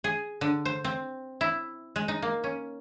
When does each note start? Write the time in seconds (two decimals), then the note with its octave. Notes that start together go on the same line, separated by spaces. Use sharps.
0.04 G#4
0.41 D3
0.65 C5
0.84 C4
1.41 E4
1.96 G#3
2.08 D#4
2.22 A#3
2.44 C#4